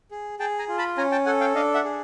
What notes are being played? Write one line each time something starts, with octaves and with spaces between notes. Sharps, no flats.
G#4
G#4 G5 A5
G#5 A#5
F4
A5 B5
C#4 G#5 A#5
G5 A5
A4 F#5 G#5
F5 G5
D4 D#5 F5
E5 F#5
G#4